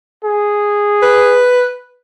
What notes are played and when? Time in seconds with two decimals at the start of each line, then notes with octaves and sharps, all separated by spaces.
0.24 G#4
1.02 B4